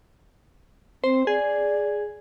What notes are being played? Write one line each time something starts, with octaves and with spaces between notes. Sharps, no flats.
C4 C5
G#4 D5